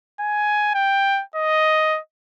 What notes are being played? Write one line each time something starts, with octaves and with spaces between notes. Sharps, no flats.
G#5
G5
D#5